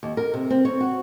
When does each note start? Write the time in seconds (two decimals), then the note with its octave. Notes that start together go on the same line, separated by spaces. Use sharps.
0.03 D#2
0.17 A#4
0.34 C3
0.50 C4
0.65 C#5
0.80 F#4